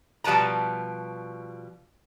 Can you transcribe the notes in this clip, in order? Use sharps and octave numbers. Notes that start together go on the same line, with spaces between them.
B2 F3 G3 B4 A5 A#5